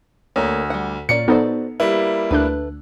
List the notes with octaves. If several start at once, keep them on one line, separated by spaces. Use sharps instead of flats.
D2 A3 A#3 C#5
G3 F#5
A#2 A#3 C#4 D5 C#7
B3 D#4 F#4 A4 C5 D5
G3 A#3 E4 B4
D2 A3 D4 B4 F#6